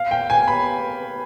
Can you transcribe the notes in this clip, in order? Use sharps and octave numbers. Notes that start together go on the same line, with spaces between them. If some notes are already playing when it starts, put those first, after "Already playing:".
Already playing: F5
G5
G#5
B5